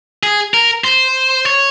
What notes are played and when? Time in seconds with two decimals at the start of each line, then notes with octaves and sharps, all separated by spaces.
0.23 G#4
0.54 A#4
0.84 C5
1.45 C#5